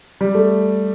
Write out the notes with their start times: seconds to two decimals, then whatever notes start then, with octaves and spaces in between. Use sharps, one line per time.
0.21 G3
0.35 A3